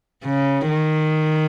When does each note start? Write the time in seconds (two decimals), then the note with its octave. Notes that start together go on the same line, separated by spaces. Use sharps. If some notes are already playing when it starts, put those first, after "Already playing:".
0.25 C#3
0.68 D#3